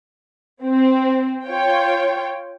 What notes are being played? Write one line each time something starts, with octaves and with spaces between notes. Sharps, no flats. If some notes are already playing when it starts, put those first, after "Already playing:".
C4
F4 C#5 G5